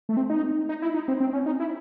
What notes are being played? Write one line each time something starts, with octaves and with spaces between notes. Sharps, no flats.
A3
C4
D#4
D#4
E4
D#4
C4
C4
C#4
D#4
E4